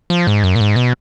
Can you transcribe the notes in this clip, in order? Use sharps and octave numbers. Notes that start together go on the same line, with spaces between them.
F3
G#2
F#2
A#2
G#2
B2